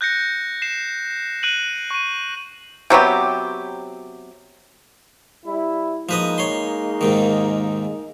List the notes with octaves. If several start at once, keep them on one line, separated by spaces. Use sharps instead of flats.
F#6 G6 A#6 C#7
C7 E7
F#6 D7 D#7 F#7
C#6 D#7
C3 F#3 B3 G4
G3 E4
F3 G#3 A#3 D#4 B4 D#5
C#5 C6
D#2 G#2 D#3